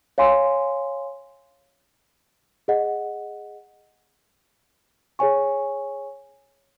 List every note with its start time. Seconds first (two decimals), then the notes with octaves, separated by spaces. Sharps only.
0.18 C#5 F5 G#5 C6
2.68 G#4 D#5 F#5
5.19 G#4 C#5 G#5 C#6